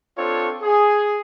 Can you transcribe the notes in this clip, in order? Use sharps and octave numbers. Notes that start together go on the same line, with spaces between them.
C4 D4 F4 A4 C#5
G#4